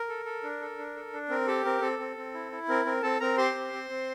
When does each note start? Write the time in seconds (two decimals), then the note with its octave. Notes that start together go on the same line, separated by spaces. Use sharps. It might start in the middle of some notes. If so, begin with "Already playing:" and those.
Already playing: A#4
0.09 A4
0.25 A4
0.43 D4
0.61 A4
0.78 D4
0.96 A4
1.13 D4
1.29 C4 A#4
1.47 G4 A4
1.65 C4 A#4
1.81 C4 A4
1.99 C4
2.17 C4
2.34 E4
2.52 E4
2.69 C4 A#4
2.85 C4 A#4
3.02 C4 A4 A5
3.20 C4 A#4 A#5
3.37 G4 C5 C6
3.55 C4
3.73 C4
3.90 C4